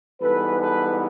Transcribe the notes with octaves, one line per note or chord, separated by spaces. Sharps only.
G#2 E3 G3 B3 A4 B4
A4 B4